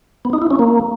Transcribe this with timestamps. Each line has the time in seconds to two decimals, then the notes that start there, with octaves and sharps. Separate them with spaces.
0.25 B3
0.33 D#4
0.42 E4
0.51 C#4
0.59 A#3